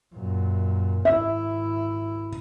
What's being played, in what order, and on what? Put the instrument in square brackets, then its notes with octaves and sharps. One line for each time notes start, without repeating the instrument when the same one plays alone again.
[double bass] F#2 A#2
[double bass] G#1 E4 [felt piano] E5